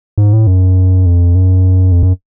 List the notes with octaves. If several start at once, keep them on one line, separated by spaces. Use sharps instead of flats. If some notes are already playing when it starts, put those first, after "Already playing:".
G#2
A2
F#2
F2
F#2
F2
F#2